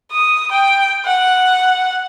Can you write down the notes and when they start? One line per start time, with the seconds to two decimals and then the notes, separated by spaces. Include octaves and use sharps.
0.11 D#6
0.51 G5
1.06 F#5